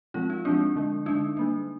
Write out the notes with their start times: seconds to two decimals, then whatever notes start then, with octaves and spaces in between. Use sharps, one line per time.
0.14 F3 G#3 C4 F4
0.30 D#4
0.45 F3 G#3 C4 D4
0.76 D3 G#3 D4
1.06 D3 G#3 D4 D#4
1.37 G3 A#3 D4